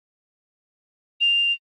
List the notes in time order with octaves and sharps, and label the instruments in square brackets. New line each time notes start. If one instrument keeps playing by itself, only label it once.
[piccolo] F7